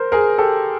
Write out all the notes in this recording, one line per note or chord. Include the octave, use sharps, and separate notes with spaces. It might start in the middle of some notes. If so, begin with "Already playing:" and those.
Already playing: A#4 C5
G#4 A#4
G4 A4